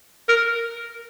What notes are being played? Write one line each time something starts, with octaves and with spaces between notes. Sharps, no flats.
A#4